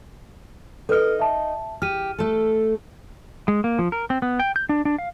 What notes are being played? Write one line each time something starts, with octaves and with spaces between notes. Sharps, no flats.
D#4 A4 B4 D#5 F6
E5 A5
G4 F6 D#7
A3 A4
G#3
A#3
F3
A#4
C4
B3
G5
G6
D4
D4
F5